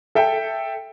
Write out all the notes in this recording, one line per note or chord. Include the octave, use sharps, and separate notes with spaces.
A4 E5 G5